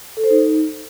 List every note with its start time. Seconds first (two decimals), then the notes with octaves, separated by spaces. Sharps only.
0.17 A4
0.24 C5
0.31 D#4